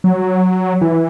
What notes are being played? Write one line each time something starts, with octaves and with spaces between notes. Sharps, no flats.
F#3
E3